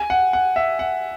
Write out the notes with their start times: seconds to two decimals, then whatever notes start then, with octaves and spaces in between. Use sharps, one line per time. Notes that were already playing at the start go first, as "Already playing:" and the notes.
Already playing: G#5
0.10 F#5
0.33 F#5
0.56 E5
0.79 F#5